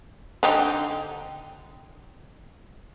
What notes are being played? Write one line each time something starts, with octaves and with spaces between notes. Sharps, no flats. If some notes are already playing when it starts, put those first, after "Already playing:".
D3 D#4 G4